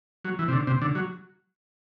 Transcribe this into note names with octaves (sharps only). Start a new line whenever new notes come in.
F#3
E3
C3
D3
C3
D3
F#3